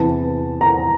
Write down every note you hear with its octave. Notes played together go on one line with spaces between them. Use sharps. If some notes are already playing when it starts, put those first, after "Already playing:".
Already playing: E2 C3 E3 A5
A#5